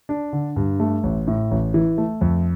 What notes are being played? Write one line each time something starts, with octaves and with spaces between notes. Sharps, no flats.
D4
D3
G2
A3
A1
A2
A1
E3
A3
F2